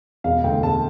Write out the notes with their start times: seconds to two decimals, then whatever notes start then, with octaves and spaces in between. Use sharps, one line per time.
0.24 E1 F5
0.44 D2 G5
0.63 E1 A5